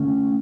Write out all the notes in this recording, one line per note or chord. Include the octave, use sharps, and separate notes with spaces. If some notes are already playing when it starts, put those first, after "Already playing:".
Already playing: D3 A3 C#4